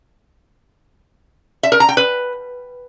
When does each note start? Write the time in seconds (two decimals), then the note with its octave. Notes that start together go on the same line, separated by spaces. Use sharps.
1.63 E5
1.72 A#4
1.80 A#5
1.89 G5
1.97 B4